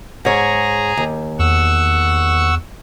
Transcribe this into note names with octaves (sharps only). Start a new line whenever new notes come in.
G#2 G#4 C#5 A#5
D#2
E2 F#5 C#6 E6